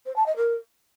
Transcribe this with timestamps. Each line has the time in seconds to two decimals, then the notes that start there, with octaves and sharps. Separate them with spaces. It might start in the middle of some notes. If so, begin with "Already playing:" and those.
0.06 C5
0.16 A5
0.26 D#5
0.36 A#4